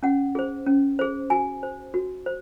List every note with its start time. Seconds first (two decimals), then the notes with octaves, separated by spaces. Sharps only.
0.03 C#4 F#5
0.35 G#4 C5
0.66 C#4
0.99 G#4 C5
1.30 F#4 G#5
1.63 C5
1.94 F#4
2.26 C5